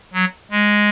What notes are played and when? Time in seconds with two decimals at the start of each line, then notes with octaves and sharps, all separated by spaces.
0.13 F#3
0.51 G#3